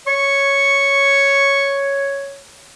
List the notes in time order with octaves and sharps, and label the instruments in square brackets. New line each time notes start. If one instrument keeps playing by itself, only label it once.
[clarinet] C#5 [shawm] C#6